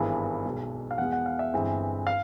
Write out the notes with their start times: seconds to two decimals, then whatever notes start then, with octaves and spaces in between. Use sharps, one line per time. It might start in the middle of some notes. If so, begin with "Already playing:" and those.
Already playing: G#1 G2 E3 G#3 B3
0.45 B1 B2 G#3
0.91 F5
0.98 E2 B2 G#3 F#5
1.12 F#5
1.26 F5
1.39 E5
1.53 G1 G2 E3 G#3 C4
2.07 F5